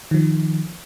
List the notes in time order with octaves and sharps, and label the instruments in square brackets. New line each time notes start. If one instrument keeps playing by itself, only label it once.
[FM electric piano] D#3 F3